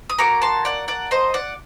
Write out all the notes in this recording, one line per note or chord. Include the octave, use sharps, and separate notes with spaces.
D#6
A#3 F#4 A4 A#5 D6
A5 C6
D5 F#5
D5 F#5
C5 D#5
D5 F#5